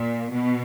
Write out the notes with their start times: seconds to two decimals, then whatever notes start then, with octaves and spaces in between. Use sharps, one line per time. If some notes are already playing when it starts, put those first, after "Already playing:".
Already playing: A#2
0.32 B2